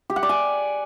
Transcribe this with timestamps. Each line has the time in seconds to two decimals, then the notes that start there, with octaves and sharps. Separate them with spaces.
0.10 G4
0.16 F#5
0.23 D5
0.29 G#5